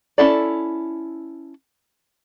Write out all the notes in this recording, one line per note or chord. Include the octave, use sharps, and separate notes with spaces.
C#4 E4 A4 D5